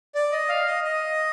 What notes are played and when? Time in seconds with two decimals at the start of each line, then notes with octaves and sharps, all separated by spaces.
0.15 D5
0.32 D#5
0.49 F5
0.66 D#5
0.84 D#5